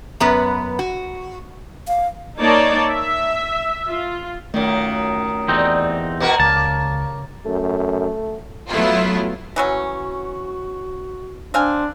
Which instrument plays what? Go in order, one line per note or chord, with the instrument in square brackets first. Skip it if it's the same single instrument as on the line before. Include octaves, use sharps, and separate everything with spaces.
[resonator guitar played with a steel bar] F#2 B3 B4
F#4
[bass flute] F5
[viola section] A#3 D#4 C#5 D5 A5
E5
F4
[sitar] F#2 D#3 [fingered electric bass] A3 [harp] C#4 F4 A#4
[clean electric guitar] E2 C4 D#4 [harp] G4 D5 A#5
[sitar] B2 F#4 A#4
[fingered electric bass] C#2 [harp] C#3 C#4 [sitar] A#3 [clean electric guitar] A5
[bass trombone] F#2 [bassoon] A3
[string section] F#3 A3 B3 E4 F4
[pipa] E3 F#3 C#4 [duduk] F#4
[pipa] C4 F5 G#5 [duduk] D4